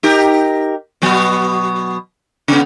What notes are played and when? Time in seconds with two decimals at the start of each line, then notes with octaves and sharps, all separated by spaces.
0.03 D#4 G4 A#4
1.02 B2 F#3 B3
2.48 C#3 B3